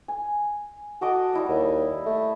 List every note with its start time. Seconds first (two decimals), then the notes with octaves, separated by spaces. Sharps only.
0.08 G#5
1.01 F#4 A4 D#5 D6
1.33 G3 E4 D#5
1.48 D#2
2.06 A3